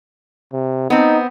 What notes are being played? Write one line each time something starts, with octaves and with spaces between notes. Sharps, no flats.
C3
B3 C4 D#4